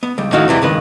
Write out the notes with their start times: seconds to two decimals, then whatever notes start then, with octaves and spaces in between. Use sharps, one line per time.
0.03 B3
0.18 C#2 G3
0.32 A2 D#3 D#4 E4 F#4 F5
0.48 E2 C3 E3 G3
0.62 C#2 G2 D#3 B4